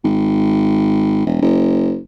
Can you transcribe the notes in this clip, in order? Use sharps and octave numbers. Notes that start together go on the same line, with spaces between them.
G#1
E1
F#1